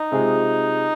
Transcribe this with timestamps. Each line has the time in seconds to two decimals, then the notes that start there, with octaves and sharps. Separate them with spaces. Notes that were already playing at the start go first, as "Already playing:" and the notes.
Already playing: D#4
0.11 C3 G#3 C4 F4 G#4